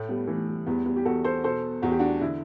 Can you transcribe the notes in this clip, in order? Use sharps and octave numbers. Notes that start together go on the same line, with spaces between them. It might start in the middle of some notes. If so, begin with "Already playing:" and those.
Already playing: A2 A3
G3 B3
E3 A3
G3
E2 G3 B3
G3 B3
G4
E2 F#4 A4
A4 C5
B2 A4 C5
E2 F#4
G4
D4 F#4
D3 E4